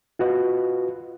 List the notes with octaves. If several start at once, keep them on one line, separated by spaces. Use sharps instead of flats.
F4 F#4 B4 D#5